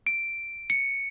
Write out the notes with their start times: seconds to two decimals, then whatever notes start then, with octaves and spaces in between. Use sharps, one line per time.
0.07 D7
0.70 C#7